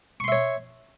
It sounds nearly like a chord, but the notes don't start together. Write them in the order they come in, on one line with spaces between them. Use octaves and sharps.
C#6 C6 E5 C#5